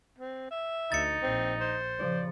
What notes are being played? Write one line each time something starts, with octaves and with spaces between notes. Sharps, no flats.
C4
E5
D2 D#4 A6 C#7
A#1 C4
C5
C#3 F3 D5